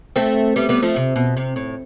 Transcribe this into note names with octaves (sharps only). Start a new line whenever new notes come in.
A3 C4
G3 B3
G3 B3
F3 A3
C3
B2
C3
A2